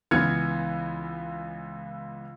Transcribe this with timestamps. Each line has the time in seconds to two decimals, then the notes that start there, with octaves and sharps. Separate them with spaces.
0.11 C#2 E3 B3 F6 G#6 C#7